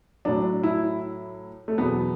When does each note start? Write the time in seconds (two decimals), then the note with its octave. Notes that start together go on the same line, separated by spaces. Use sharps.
0.25 A2 F#3 D4
0.63 E4
1.68 A3
1.77 E2 B2 F#3 B3